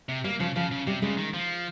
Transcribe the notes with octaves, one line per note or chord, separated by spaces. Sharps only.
C3
G3 A#3
C#3 F3
C#3 F3
C#3
C3 G3
C#3 G#3
D#3
F3